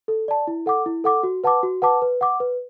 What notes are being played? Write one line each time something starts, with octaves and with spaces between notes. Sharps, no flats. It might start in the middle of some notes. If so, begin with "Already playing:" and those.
A4
D5 A5
E4
A4 F#5 D6
E4
A4 F#5 D6
F#4
B4 F#5 A5 D6
F#4
B4 F#5 A5 D6
B4
F#5 D6
B4